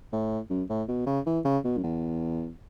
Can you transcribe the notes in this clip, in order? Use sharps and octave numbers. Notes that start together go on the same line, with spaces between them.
A2
F#2
A2
B2
C#3
E3
C#3
B2
F#2
E2